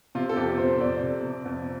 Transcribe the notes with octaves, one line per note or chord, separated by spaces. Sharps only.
C3 F4
A4
F2 G4
F2 C5
F2 D5
C3
C3
F2